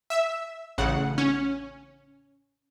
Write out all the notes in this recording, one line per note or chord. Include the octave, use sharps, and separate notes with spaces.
E5 E6
A1 C#3 F#5
C#4